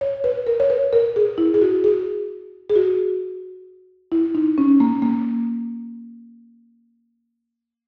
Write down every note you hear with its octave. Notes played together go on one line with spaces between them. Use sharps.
C#5
B4
A#4
C#5
B4
A#4
G#4
E4
G#4
F#4
G#4
G#4
F#4
E4
D#4
C#4
A#3
A#3